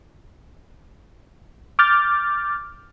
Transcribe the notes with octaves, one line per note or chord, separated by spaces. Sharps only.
D6 F6 G6 A6